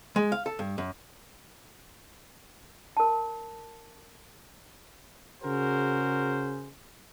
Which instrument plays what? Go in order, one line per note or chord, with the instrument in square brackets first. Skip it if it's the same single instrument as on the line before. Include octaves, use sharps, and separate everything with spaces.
[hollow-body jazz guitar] G#3
F5
A4
G2
F#2
[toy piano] A#4 A5
[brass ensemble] C#3 F#4 G#4 A#4 C5